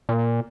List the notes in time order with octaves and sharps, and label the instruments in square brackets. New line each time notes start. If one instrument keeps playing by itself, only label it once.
[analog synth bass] A#2